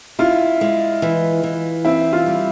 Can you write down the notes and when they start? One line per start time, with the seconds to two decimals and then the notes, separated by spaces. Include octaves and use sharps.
0.19 E4 F4
0.61 G#3
1.02 E3
1.43 E3
1.85 C4 E4
2.13 F4
2.26 G3